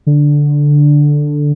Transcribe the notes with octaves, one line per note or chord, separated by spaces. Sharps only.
D3